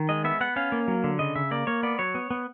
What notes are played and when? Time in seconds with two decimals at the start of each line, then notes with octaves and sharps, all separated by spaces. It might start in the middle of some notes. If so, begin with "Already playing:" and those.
Already playing: D#3
0.09 G#3 D#5
0.24 B3 E5
0.41 B3 F#5
0.56 C#4 F5
0.72 A#3
0.88 F#3
1.04 D3
1.19 C#3 D#5
1.35 C#3 E5
1.51 A#3 D5
1.67 A#3 C#5
1.83 B3 D5
1.99 F#3 C#5
2.15 B3
2.31 B3